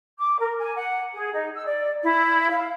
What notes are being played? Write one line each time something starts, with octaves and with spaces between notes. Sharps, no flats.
D6
A#4
G#5
F#5
G#4
D#4
E6
D5
E4
F5